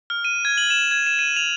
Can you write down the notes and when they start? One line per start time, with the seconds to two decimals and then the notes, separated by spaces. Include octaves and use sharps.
0.10 F6
0.25 D#7
0.45 G#6
0.58 F#7
0.70 E7
0.91 G#6
1.07 E7
1.19 D#7
1.36 F7